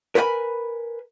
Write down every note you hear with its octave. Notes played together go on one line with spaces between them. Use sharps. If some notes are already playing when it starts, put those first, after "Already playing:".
A#4 B4 C#5 F#5 G#5 B5